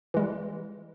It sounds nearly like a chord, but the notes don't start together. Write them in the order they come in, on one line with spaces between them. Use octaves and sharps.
E3 G#3 G3